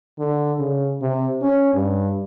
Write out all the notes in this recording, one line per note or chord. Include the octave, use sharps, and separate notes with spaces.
D3
C#3
C3
C#4
G2